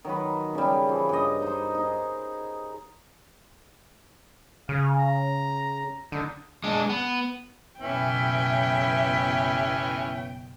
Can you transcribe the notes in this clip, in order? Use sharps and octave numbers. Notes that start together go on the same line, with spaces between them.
D#3 F#3 A#4 B4
C#3 G3
E3 F3
G2 D#5
D#4 C5
D#4 G#4
C#3 F5
A#5
D3 D#4
G#3 D4
B3
F#1 B2 E3 B3 C#4 E5 G5